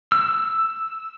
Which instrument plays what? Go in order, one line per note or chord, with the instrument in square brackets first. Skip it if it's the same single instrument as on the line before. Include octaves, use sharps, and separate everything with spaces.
[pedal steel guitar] E6